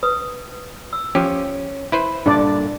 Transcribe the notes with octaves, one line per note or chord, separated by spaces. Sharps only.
B4 D#6
E6
F3 C#4 G4
E4 B4 C5
G2 A#2 D3 D4 D5